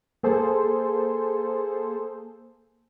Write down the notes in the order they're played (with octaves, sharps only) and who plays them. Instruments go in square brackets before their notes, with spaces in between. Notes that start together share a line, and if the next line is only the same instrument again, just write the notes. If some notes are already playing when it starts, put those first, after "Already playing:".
[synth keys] A#3 G#4 A4 C5